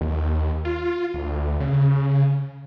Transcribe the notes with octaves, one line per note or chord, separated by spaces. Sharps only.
D#2
F4
D2
C#3